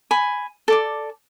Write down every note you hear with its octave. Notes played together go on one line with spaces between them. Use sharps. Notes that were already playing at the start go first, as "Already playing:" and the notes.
G#5 B5
A4 D5 D6